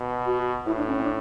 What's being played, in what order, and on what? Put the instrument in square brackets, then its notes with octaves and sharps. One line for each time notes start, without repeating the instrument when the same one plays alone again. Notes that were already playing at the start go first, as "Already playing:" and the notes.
Already playing: [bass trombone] B2
[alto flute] F#4
[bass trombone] A2 [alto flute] E4
[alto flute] D4
C#4
C#4
D4